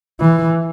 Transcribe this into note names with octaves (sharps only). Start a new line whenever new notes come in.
E3